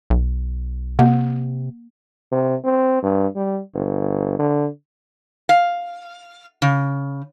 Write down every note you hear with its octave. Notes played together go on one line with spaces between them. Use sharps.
B1
C3 A#3
C3
C4
G2
G3
G1
D3
F5
C#3